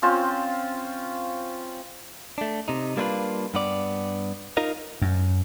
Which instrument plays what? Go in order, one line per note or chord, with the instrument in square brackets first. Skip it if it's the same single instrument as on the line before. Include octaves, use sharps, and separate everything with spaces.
[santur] C4 C#4 F4 C5
[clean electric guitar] A3 D4
C3 D#4
G3 A#3 D4 E4 F4 B4
G2 B3 D5
D#4 F4 A#4 D#5 F5
[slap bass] F#2